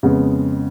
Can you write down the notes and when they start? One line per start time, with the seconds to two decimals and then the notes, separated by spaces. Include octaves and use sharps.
0.03 F2 C#3 G#3 B3